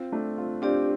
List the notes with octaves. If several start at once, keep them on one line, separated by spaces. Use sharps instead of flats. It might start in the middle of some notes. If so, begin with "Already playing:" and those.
Already playing: C4 F4
A3 D4
C4 F4
C4 D4 F4 G4 D5